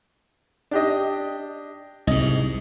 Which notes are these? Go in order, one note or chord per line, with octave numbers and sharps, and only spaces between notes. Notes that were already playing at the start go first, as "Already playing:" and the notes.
D4 G4 D#5
C2 G#2 D#5